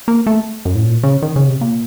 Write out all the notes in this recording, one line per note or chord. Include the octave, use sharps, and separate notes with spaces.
A#3
A3
F#2
A2
A#2
C#3
D#3
C#3
C3
A#2